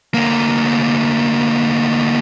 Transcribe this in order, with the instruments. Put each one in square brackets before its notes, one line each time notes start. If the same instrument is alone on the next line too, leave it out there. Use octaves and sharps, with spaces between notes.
[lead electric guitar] D2 A#3